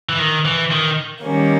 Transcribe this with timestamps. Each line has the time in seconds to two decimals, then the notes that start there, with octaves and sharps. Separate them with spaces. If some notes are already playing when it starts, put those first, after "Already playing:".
0.09 E3
0.19 D#3
0.45 E3
0.71 D#3
1.23 D#3 G3 A#3 C#4